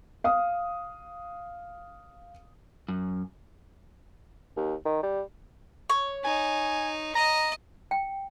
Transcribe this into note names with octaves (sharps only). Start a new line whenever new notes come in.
F5 D#6
F#2
D#2
D#3
G3
C#5
D#4 G#5
D#5 A#5
G5